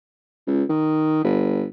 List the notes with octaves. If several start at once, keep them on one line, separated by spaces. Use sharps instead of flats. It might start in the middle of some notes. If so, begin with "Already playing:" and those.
C#2
D#3
G1